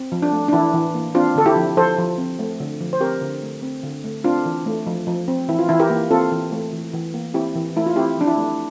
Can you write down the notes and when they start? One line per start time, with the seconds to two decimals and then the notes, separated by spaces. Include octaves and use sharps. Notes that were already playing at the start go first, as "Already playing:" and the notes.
Already playing: C4
0.12 F3
0.22 D4
0.32 A3
0.48 D4
0.53 E3 E4
0.73 E3
0.95 A#3
1.15 C4 D4 F4
1.35 D3 A4
1.46 E4 G4
1.56 F3
1.77 F3 A4 C5
1.98 F3
2.18 C4
2.39 A3
2.60 D3
2.80 F3
2.93 C5
3.01 C4 G4 A#4
3.22 D3
3.42 A3
3.63 C4
3.83 D3
4.04 A3
4.24 C4 D4 F4
4.45 E3
4.66 A3
4.86 F3
5.07 F3
5.28 C4
5.49 E3 E4
5.59 F4
5.69 E3 E4
5.80 G4 A#4
5.90 A#3
6.11 C4 F4 A4
6.32 E3
6.52 A3
6.73 E3
6.93 E3
7.14 A#3
7.34 C4 E4 G4
7.55 E3
7.76 A3 E4
7.86 F4
7.96 C4 E4 G4
8.17 F3 D4
8.27 E4
8.37 A3